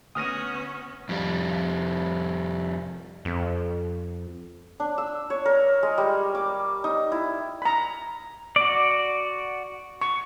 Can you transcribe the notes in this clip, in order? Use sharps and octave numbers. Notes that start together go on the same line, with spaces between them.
D2 B3 C#4 D#6 F6 A#6 D#7
F2 G3
F2
D4
E6
C#5
A#4
G#3
G3
D6
D#4
E4
A#5 B5
F#4 D5
C#6